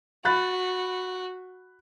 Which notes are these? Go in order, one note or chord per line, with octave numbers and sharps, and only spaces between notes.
F#4 B5 F#6 A6